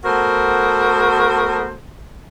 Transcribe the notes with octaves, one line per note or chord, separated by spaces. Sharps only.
A3 B3 F#4 A#4 C5